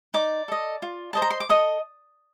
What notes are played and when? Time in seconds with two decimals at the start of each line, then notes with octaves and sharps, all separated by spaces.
0.14 D#4 D5 D6
0.48 A4 D#5
0.82 F4
1.13 C5 D#5 A5
1.22 A#5
1.30 C6
1.40 D6
1.49 A4 D#5 D#6